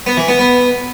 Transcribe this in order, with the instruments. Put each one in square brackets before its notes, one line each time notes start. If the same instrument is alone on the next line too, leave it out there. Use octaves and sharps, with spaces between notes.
[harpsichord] B3
E3
B3
B3